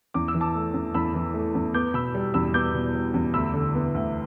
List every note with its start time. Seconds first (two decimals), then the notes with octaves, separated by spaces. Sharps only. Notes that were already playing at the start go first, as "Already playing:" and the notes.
0.14 E2 D6
0.28 E6
0.35 E3
0.41 A5 D6
0.55 A3
0.74 E2
0.94 E2 B5 E6
1.15 E3
1.34 A3
1.55 E2
1.74 B3 D6 G6
1.94 B2 B5 E6
2.15 G3
2.34 E2 B5 E6
2.54 B3 D6 G6
2.74 B2
2.94 G3
3.14 E2
3.34 D2 B5 E6
3.54 D3
3.75 B3
3.94 D2